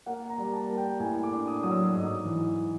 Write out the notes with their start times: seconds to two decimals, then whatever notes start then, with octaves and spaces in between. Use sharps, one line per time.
0.06 A#3 F#5
0.30 A#5
0.38 G3
0.53 A5
0.70 A#3
0.77 G5
1.00 A2 G#5
1.23 D6
1.32 D4
1.47 D#6
1.63 F#3 D#6
1.71 E6
1.94 G#2 D#6
2.25 E3